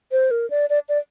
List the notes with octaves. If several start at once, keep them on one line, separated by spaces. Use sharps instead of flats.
C5
A#4
D5
D5
D5